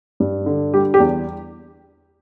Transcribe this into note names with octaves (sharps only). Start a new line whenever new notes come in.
G2
D3
G3 G4
G4
E2